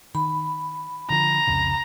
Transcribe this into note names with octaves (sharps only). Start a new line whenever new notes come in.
D#3 B5
D3 F3 A#5
C2 F2 C#3